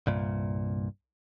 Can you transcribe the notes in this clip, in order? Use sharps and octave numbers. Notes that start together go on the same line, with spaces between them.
C2 G2 A#2